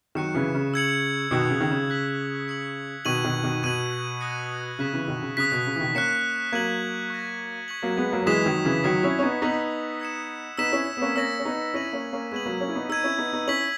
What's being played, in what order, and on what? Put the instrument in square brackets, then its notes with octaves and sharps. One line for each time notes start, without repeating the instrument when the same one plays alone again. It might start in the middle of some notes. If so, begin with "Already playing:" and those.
[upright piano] D#3 F#3 [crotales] C#6 F#6 C#7 E7
[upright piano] C#3 E3
C#3
[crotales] E6 G#6 C#7 F#7
[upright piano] B2 D#3 [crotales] D#6 F#6 C#7
[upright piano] C#3
D#3
C#3
[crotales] F#6 B6 F#7
G#6 C#7 F#7
[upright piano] B2 D#3 [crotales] C#6 G#6 D#7 F#7
[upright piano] B2 D#3
B2 D#3
[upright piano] B2 [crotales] G#6 D#7 F#7
[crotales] D#6 F#6 A#6 C#7
[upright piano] C#3 [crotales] F#6 B6 E7
[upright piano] C#3 E3
B2 D#3
C#3
[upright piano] C#3 [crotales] D#6 F#6 B6
[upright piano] B2
C#3
E3
B2 D#3
[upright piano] A#3 C#4 [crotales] F#6 C#7 E7
[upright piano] F#3 A#3 [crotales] G#6 D#7 F#7
[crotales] C#6 F#6 A#6 D#7
C#6 G#6 B6 F#7
[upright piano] F#3 A#3
G#3 B3
F#3 A#3
F#3
[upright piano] E3 G#3 [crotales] D#6 G#6 B6 E7
[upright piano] D#3 F#3
C#3 E3
[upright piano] D#3 F#3 [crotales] D#6 F#6 C#7 E7
[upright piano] C#4 E4
C#4
B3 D#4
[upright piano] B3 D#4 [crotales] E6 G#6 B6 F#7
[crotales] E6 G#6 C#7 E7
[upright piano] B3 D#4 [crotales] E6 B6 E7
[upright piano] C#4 E4
B3
A#3 C#4
[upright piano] A#3 C#4 [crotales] E6 A#6 E7
[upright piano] C#4
B3 D#4
[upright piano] C#4 E4 [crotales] E6 A#6 D#7 F#7
[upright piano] A#3 C#4
A#3 C#4
[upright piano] G#3 B3 [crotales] C#6 G#6 D#7 F#7
[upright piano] F#3 A#3
A#3 C#4
E4
B3 D#4
[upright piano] B3 D#4 [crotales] E6 G#6 D#7
[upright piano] C#4 E4
B3 D#4
B3 D#4
[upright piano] C#4 E4 [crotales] E6 B6 F#7